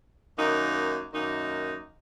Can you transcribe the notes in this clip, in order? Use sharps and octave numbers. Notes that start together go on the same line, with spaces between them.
F#2 D#3 A#3 D#4
F#2 D#3 A#3 D#4